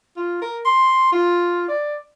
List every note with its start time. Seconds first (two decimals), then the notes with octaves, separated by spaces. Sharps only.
0.16 F4
0.42 A#4
0.65 C6
1.12 F4
1.68 D5